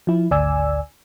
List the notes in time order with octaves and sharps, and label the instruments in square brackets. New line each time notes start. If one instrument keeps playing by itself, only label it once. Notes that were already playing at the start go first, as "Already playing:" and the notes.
[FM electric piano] F3 E4
G#1 D2 D5 G#5 E6